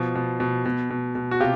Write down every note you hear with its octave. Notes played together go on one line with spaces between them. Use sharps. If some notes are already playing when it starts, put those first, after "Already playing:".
Already playing: B2 F3
B2
B2
B2
B2
B2
F#4
C3 F4 G4